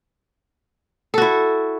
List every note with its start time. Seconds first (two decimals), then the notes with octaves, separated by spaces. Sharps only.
1.14 A4
1.18 F#4
1.22 E4